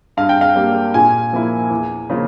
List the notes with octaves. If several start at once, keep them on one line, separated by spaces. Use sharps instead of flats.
G2 F5
G5
F5
G3 A#3
A#2 G#5
F3 A#3 E4
E2
C#3 F3 A#3 F4